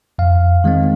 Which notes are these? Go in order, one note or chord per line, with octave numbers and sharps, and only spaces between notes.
F2 F5
D#3 G#3 C4